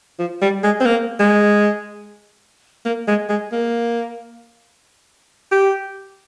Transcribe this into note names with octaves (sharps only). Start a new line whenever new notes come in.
F3
G3
G#3
C4
A#3
G#3
A#3
G#3
G#3
A#3
G4